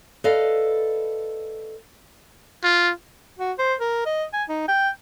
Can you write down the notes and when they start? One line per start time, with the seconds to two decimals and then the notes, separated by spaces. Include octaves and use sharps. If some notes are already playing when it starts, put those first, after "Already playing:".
0.24 A4 B4 D5 D#5 F5
2.63 F4
3.39 F#4
3.59 C5
3.80 A#4
4.06 D#5
4.33 G#5
4.49 D#4
4.68 G5